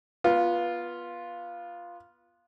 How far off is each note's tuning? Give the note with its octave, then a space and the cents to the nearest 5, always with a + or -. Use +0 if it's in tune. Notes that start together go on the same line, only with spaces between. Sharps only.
B3 -20 F4 +0